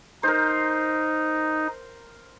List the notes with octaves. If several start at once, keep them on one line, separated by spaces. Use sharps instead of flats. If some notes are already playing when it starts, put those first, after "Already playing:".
D#4 A#4 C5